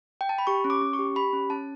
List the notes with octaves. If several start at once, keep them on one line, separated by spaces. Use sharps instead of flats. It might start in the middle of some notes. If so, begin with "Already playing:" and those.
G5
A5
B5
G4 C#6
C#4
D6
C#4
C#6
G4
G4 B5
C#4
C#4 A5